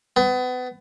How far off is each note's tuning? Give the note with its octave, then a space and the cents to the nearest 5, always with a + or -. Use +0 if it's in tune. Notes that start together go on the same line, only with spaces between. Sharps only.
B3 +30